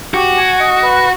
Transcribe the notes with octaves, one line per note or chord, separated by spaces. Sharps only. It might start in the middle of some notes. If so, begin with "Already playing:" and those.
F#4 G4
G#5
D#5
B4